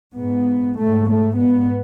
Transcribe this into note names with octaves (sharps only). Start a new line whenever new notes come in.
G#2 B3
G#2 A3
A3
G#2 B3